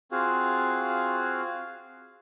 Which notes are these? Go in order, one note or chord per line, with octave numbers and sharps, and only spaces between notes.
C4 F4 F#4 G#4 F5